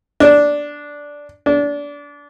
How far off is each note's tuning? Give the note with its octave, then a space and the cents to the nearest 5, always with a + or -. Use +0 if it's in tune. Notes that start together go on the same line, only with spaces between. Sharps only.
D4 -5
D4 -25